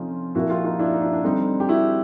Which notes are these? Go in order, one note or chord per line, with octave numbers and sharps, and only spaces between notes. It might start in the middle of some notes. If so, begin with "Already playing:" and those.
Already playing: C3 F3 A3 C#4 D#4 F4
A#2 F3 A#3 E4 F#4
F4 G4
D#4 F4
D4 E4
D#4
D4 E4
D4
D3 G3 C4 D#4
G4
E4 F#4